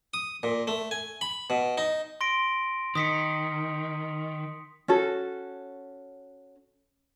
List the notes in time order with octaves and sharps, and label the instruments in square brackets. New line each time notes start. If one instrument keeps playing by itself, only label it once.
[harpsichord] D#6
A#2
A3
G#5
B5
B2
D#4
[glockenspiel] C6 A#6 D7
[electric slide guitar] D#3 [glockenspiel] D#6 B6 C#7
[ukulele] C#4 F#4 A4